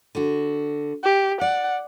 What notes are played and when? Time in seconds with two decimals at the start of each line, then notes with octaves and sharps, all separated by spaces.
0.15 D3 F#4
1.04 G4
1.41 D5 F#5